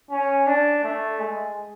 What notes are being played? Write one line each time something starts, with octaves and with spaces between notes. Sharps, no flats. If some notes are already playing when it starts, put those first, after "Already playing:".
C#4
D4
A3
G#3